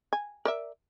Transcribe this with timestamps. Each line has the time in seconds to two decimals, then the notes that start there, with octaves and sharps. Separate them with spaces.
0.13 G#5
0.45 A#4 D5 E5